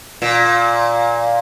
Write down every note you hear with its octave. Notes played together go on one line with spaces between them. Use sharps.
A#2